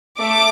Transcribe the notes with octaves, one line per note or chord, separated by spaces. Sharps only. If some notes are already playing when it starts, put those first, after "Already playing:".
A3 D6